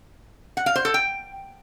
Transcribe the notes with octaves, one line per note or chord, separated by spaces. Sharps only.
F#5
F5
C5
A4
G5